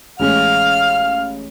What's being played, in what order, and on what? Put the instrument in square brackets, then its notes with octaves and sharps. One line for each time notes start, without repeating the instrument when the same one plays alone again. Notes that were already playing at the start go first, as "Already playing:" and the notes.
[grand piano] A1 G#3 C#4 [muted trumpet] F5 [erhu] F6